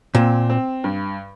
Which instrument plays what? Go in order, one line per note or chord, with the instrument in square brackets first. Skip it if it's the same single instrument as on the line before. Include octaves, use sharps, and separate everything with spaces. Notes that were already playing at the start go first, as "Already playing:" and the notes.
[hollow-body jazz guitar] A#2 [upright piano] C4
[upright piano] C4
G2